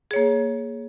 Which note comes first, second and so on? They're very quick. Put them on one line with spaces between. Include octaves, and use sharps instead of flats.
G#4 C#5 A#3